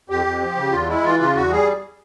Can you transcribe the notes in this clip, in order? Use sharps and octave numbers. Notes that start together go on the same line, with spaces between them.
F2 G4
F2
F3
C#3
E2 F4
G#3 E4
E3 F4
C#3 F4
E2 F#4
G3 G#4